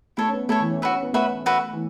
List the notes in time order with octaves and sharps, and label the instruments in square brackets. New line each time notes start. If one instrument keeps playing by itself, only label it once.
[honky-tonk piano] A3 [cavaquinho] E4 A4 C#5
[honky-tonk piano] C#4
B3
[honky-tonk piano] A3 [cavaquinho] E4 A4 C#5
[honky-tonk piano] E3
C#4
[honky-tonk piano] C#4 [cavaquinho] F#4 B4 E5
[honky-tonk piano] C#4
B3
[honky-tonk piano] A3 [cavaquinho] F#4 B4 E5
[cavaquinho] F#4 B4 E5
[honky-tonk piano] E3